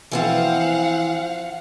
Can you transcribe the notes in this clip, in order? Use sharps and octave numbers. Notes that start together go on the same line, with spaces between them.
E3 F3 C4 F5 F#5